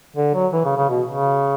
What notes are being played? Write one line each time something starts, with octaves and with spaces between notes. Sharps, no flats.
D3
F#3
E3
C#3
C#3
B2
C#3